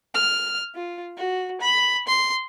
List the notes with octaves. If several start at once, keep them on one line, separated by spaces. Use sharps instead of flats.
F6
F4
F#4
B5
C6